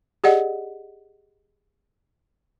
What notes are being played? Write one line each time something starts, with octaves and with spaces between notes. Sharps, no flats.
G4 G#4 D5 D#5 F#5